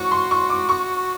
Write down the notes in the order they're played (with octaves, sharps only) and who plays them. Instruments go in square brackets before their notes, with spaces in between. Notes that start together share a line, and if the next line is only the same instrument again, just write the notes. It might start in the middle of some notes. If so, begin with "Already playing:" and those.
Already playing: [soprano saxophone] F#4 [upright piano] C#6
[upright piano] C6
C#6
D6
C#6